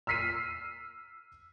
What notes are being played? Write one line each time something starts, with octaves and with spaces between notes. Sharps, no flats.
E6 F6 B6 C7 D#7